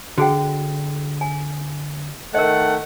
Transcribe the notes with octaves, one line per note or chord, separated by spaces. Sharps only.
D3 F#4 G#4 G5
G#5
D#3 A3 A#4 D#5 F#5